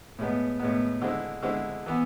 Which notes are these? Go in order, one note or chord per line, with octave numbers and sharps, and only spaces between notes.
A2 G#3 B3
A2 G#3 B3
D3 G#3 C4 E4
D3 G#3 C4 E4
E3 B3